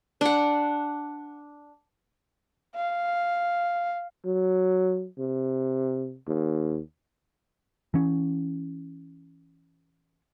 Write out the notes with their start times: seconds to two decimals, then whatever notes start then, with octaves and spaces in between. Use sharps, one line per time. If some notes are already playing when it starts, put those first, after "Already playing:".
0.21 D4 F#5
2.75 F5
4.25 F#3
5.19 C3
6.28 D#2
7.94 E3 C#4